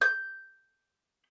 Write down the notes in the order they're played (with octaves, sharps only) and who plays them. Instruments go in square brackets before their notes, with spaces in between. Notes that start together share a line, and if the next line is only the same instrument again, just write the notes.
[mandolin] G6